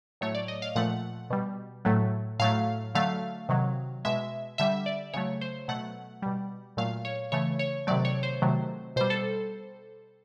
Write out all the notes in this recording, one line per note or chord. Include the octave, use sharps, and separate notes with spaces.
A2 F#3 A3 C#5
D5
D#5
F5
A#2 F3 A3 F#5
B2 G3
A2 F#3 A3
A2 F#3 A3 F5
D3 F#3 A3 F5
C3 D#3 F#3
B2 G#3 E5
D3 G3 E5
D5
C#3 F#3 A3 C#5
C5
B2 F#3 A3 F#5
B2 G3
A#2 F#3 A3 F5
C#5
C#3 E3 A3 C#5
C#5
C3 D#3 F#3 A3 D5
C#5
C5
C3 D#3 F#3 A3
B2 G3 C5
A4